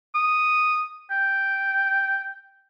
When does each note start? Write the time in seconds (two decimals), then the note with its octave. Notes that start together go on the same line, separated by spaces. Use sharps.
0.15 D#6
1.11 G5